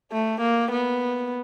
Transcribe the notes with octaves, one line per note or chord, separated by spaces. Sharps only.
A3
A#3
B3